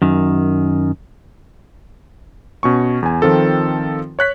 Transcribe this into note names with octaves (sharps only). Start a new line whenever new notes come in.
F#2 D#3
B2 C#4 C#6
E2 G#5
D#3 F3 C4 F4 A4
C#5 F#6 B6